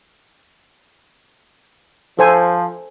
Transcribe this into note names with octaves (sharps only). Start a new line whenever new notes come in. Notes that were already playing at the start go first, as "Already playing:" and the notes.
F3 A4 C5 G#5